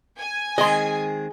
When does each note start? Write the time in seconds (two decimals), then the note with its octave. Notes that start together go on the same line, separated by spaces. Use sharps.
0.18 G#5
0.58 D#3 G#3 C4 G#4 D#5 C6